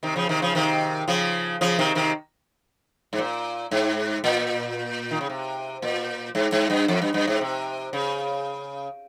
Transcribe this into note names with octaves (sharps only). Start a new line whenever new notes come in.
C3 D#3
C#3 F3
C3 D#3
C#3 F3
C3 D#3
C#3 F3
C#3 F3
C3 D#3
C3 D#3
G#2
A#2
G#2
A#2
D#3
C#3
C3
A#2
G#2
G#2
G2
F2
G2
G2
G#2
C3
C#3